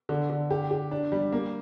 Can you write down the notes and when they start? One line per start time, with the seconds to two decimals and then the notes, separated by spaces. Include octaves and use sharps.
0.09 D3
0.30 D3
0.50 G4
0.71 G4
0.91 D4
1.12 G3
1.32 A#3